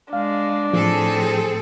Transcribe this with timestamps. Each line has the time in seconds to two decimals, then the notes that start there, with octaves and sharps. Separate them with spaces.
0.13 G#3 D4 F5
0.73 A2 F3 C4 G#4 A4